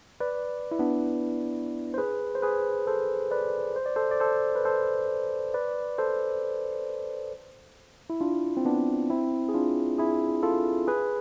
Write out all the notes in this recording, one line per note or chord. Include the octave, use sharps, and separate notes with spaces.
B4 D5
E4
B3 D4
C5
G#4 B4
C5
G#4 B4
A4 C5
B4 D5
C5
D5
A4 C5
D5
A4 C5
B4
A4 C5
B4 D5
A4 C5
E4
D4 F4
C4
B3 D4
C4 E4
G#4
D4 F4
E4 G#4
F4 A4
G#4 B4